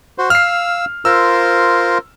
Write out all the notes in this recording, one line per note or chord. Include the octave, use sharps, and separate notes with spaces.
F#4 C5
F5 E6 F6 C7
F4 A#4 C5 E6